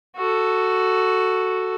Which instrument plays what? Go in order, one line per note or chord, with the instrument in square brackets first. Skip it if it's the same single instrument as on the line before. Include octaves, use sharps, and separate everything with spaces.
[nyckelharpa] F#4 A4